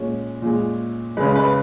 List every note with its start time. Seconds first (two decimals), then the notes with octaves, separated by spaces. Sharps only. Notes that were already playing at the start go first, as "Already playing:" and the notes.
Already playing: A#2 G#3 C#4
0.42 A#2 G#3
1.17 C#3 G#3 B4
1.35 B4